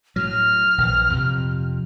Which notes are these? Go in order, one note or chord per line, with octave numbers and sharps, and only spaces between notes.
A2 F#3 F6
A#1 E3
F2 C3